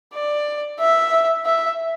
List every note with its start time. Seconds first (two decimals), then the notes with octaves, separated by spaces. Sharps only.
0.14 D5
0.80 E5
1.46 E5